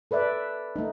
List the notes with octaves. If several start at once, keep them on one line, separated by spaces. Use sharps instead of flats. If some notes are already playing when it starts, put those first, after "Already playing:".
A4 B4 D5 E5
A3 D#4